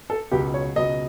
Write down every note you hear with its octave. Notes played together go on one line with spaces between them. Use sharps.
A4
C#2 B2 F#3 G4
C#5
C#2 B2 F#3 D#5